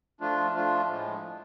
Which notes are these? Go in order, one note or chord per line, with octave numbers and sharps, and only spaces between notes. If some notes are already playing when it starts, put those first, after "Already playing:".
F3 A3 D4 F4
F3 A3 D4 F4
A2 F3 G#3